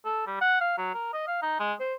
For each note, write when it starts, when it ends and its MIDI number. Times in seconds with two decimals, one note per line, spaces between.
0.05 0.22 69
0.27 0.40 55
0.41 0.57 78
0.61 0.73 77
0.78 0.92 54
0.94 1.13 70
1.13 1.24 75
1.27 1.41 77
1.42 1.59 63
1.60 1.73 56
1.80 1.94 72